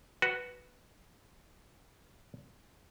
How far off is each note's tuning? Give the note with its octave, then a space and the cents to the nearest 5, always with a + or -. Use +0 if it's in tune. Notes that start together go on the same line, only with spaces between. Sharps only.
F#4 +0 B4 +0